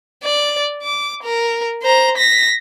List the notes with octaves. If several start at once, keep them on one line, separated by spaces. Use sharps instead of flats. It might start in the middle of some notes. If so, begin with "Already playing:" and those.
D5
D6
A#4
C5 A#5
A#6 B6